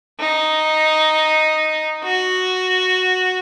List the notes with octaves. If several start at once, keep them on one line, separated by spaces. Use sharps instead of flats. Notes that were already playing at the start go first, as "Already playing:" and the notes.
D#4
F#4